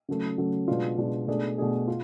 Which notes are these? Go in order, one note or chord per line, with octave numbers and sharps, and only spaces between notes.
C#3 F#3 A3
C#3 F#3 A3
B2 G#3 B3 D4 F4
B2 G#3 B3 D4 F4
B2 A3 D4 G#4
B2 A3 D4 G#4
F4